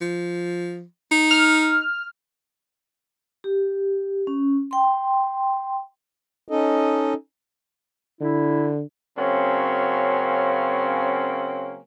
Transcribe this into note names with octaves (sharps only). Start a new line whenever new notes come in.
F3
D#4
F6
G4
C#4
G5 C6
C#4 D#4 A4 D#5
D3 E4
C#3 F#3 A#3 C4 C#4